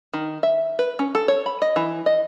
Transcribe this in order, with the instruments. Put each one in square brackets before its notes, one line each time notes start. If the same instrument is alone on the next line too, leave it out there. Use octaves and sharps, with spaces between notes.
[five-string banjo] D#3
E5
B4
C#4
A4
C#5
B5
D#5
E3
D#5